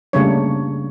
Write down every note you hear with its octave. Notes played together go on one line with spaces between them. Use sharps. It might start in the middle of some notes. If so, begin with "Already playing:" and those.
C#3 G3 A3 A#3 D4 C#5